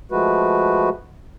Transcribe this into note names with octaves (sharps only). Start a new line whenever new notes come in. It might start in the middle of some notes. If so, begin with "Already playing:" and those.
F3 G#3 A3 F#4 B4